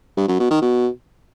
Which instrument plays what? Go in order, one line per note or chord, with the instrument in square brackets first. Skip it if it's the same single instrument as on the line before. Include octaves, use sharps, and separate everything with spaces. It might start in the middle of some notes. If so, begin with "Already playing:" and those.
[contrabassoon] G2
F#2
B2
D#3
B2